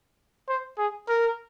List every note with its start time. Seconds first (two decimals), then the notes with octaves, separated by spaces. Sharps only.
0.49 C5
0.78 G#4
1.09 A#4